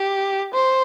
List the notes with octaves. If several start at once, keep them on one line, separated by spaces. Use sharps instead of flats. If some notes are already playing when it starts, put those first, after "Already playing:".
Already playing: G4
C5